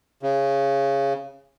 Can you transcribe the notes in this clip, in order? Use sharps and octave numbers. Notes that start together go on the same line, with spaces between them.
C#3